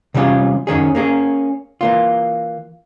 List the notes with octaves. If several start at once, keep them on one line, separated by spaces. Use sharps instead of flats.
C3 E3 G3 C#4 F4 G#4
F#2 D#3 C#4 G#4
A#3 C#4 G#4
E3 A#3 F4